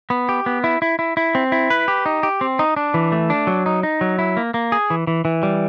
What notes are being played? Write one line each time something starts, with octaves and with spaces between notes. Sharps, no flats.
B3
G4
B3
E4
E4
E4
E4
C4
E4
B4
G4
D#4
G4
C4
D#4
D4
E3
A3
D4
F#3
D#4
D#4
F#3
E4
A#3
A#3
G#4
E3
E3
E3
G3